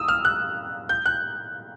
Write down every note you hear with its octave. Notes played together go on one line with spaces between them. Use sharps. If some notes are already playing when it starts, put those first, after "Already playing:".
Already playing: D#6 E6
F6
F#6
G6
F#6